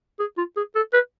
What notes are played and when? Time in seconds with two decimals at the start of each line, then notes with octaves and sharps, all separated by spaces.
0.20 G#4
0.37 F4
0.57 G#4
0.75 A4
0.93 B4